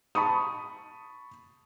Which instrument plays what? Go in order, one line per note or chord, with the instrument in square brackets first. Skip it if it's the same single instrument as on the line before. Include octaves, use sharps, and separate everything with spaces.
[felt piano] A5 B5 C#6 D#6